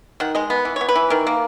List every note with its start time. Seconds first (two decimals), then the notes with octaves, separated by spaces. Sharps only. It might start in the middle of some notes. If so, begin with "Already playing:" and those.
0.20 D#3 F#5
0.35 G#3 D#5
0.50 B3
0.65 E3
0.76 B3 C#5
0.89 B4
0.96 E3
1.10 D#3 A#4
1.27 A#3